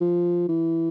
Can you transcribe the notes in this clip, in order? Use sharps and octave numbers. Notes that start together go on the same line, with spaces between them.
F3
E3